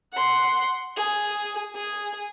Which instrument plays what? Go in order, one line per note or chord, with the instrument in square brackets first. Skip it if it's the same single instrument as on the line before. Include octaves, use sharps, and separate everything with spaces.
[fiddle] F#5 C6
G#4
G#4